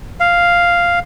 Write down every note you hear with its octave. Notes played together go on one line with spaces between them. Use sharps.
F5